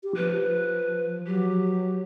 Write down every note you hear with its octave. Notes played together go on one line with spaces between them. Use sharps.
G4
F3 B4
F#3 G4